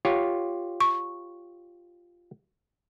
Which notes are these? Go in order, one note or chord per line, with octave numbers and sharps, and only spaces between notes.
F4 G4 C#5
C#6